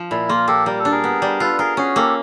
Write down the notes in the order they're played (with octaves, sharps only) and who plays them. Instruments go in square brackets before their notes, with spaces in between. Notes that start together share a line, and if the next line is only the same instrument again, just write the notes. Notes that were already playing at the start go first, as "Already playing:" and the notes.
Already playing: [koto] F3
[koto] A#2 [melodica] E4
[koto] A#3 [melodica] F4
[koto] A#3 [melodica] G4 A4
[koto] G3 [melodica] A#4
[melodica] A4
[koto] D4
[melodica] G#4 A#4
[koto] B3
G3
[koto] F4 [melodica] A4 B4
[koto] F4 [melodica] G#4 A#4
[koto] C#4 [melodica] F#4 G#4
[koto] A#3 [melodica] G4 A4